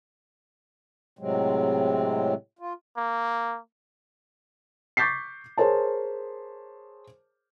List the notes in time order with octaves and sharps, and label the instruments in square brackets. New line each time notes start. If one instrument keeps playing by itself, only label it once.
[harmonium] A2 C3 F#3 G#3 C4
F4
[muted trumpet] A#3
[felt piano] C#6 D6 G6 A6 B6 C7
G#4 A#4 C5 C#5 A5